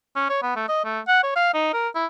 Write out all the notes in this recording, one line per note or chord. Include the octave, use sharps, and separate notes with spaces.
C#4
C#5
B3
A3
D#5
A3
F#5
C#5
F5
D#4
A#4
E4